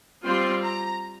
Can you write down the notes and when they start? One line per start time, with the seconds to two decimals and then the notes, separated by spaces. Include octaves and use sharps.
0.23 G3 C4 F4 C6
0.63 A#5